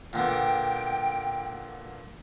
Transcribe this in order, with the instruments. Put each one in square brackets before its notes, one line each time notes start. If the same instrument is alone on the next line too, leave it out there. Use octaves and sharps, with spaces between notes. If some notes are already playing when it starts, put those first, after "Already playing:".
[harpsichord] A#2 D3 B3 [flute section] G5